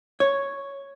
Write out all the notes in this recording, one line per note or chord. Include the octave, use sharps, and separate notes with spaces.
C#5